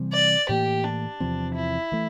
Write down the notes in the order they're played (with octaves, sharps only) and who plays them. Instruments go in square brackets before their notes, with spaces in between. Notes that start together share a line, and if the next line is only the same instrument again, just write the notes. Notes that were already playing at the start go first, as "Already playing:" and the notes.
Already playing: [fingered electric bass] C3 E3 G3 C4
[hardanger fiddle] D5
[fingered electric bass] A2 E3 A#3 [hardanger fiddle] G4
[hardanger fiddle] D4
[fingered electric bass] E2 C3 F3 C4
[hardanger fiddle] E4
[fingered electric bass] E3 A3